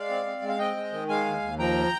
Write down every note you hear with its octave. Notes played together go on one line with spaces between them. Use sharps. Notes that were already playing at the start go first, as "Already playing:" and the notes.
Already playing: G#3 D5 F5
C4
C4
G#3
F5
C4 D#5 G5
G#3
D#3
G#3 F5 G#5
D#2
D#2
F3 G5 A#5